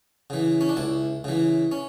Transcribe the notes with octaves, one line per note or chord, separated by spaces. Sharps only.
C#3 E3
C#4
D4
C#2 E4
C#3 E3
C#4